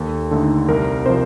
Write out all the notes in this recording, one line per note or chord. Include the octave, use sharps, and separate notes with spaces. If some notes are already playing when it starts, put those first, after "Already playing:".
Already playing: D#2 A4
D3 A3 D#4
C2 A#4
C3 F3 C5